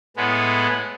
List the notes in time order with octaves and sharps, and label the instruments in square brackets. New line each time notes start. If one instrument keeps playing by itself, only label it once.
[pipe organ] A2 G#3 B3